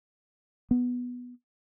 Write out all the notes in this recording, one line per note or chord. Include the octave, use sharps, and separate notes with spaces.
B3